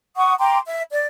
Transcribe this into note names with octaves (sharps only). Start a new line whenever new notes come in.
F#5 C#6 D#6
G5 A#5 C6 D6
E5
D5